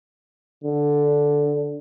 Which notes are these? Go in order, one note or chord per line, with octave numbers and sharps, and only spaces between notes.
D3